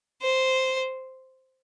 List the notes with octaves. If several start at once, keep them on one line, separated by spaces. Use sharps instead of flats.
C5